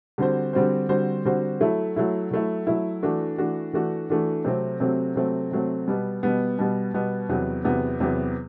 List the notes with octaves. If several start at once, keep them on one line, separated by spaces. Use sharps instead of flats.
D3 G3 C4 F#4 C5
D3 G3 C4 F#4 C5
D3 G3 C4 F#4 C5
D3 G3 C4 F#4 C5
F#3 A3 E4
F#3 A3 E4
F#3 A3 E4
F#3 A3 E4
E3 A3 D4 F#4
E3 A3 D4 F#4
E3 A3 D4 F#4
E3 A3 D4 F#4
C3 F#3 A3 C4
C3 F#3 A3 C4
C3 F#3 A3 C4
C3 F#3 A3 C4
B2 G3 B3
B2 G3 B3
B2 G3 B3
B2 G3 B3
E2 C3 F#3 B3
E2 C3 F#3 B3
E2 C3 F#3 B3